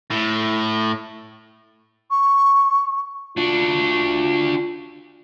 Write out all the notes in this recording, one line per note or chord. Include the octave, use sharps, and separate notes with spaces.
A2
C#6
D4 F4 F#4